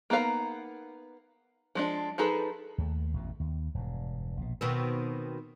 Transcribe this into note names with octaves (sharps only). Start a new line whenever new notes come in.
A#3 B3 D#4 F5 A#5
F3 G#3 D4
F3 D#4 G#4 A4 B4
D#2 A3
A1 F2 B2
D#2
E1 G2
A#1 B2
B2 D#3 C4